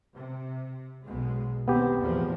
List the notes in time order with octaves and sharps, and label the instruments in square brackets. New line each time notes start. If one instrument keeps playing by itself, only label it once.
[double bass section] C3
B1 B2 G#3
[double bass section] D#2 C4 [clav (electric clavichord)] B3 G4
[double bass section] E2 A2 F3